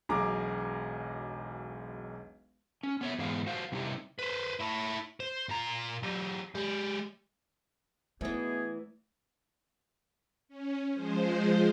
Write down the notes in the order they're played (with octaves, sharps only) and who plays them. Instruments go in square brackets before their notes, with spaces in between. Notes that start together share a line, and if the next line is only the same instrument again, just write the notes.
[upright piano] E1 B1 G#4 A#5 D6
[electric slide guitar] C#4
B3 C#5 E5
G#2 E3 B3 F5
F#4 C5 F5
C3 G3 D#4 E4 G4
[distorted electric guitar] B4 C5
E4 C#5
C5
A#2 A#5
F#3 G4
G#3 G4
[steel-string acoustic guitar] E2 E3 [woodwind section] B2 B3 G#4 [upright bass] A3
[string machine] C#4
F3 G#3 C5